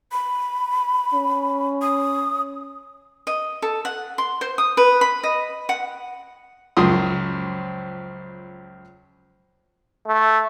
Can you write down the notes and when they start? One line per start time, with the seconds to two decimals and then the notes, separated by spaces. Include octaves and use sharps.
0.12 B5
1.14 C#4
1.82 D#6
3.27 D#5
3.62 A4
3.85 F#5
4.18 C6
4.41 C5
4.58 D#6
4.77 B4
5.01 B5
5.23 D#5
5.69 F#5
6.77 C#2 F#2 F3 C6 D#6
10.07 A3